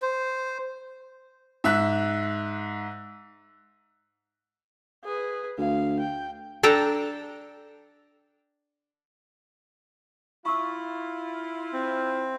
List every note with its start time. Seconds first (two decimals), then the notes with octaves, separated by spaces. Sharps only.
0.02 C5
1.64 G#2 E5 E6 F#6
5.05 G#4 B4
5.58 D2 F5
6.00 G5
6.63 D4 A4 G5 A#5
10.46 E4 F4 C#6 E6
11.73 C4